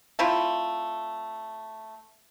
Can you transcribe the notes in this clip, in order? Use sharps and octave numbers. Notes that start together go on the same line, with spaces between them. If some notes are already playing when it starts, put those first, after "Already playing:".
A3 C4 E4 F4